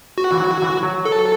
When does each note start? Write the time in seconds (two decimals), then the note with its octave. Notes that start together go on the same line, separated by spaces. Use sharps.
0.18 F#4
0.32 E3
0.40 F#3
0.62 E3
0.83 F#3
1.05 A4